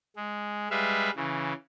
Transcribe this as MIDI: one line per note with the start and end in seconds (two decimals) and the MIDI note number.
0.16 0.69 56
0.70 1.10 55
0.70 1.10 56
0.70 1.10 71
0.70 1.10 76
0.70 1.10 77
1.16 1.53 49
1.16 1.53 52